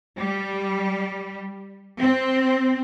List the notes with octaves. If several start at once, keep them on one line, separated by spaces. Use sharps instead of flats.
G3
C4